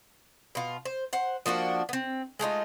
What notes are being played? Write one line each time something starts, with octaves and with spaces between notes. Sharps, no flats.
B2 F4
C5
C5 F#5
F3 A#3 D4 F#4
B3 C4
G#3 A3 D#4 F4